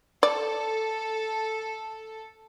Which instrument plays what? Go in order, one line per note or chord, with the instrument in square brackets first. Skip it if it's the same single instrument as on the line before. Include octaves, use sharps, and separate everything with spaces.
[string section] A4 [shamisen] D5